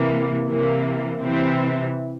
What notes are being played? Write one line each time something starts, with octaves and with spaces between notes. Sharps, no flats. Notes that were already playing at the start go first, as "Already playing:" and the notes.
Already playing: C3 E3 A#3
C3 E3 A#3
C3 E3 C4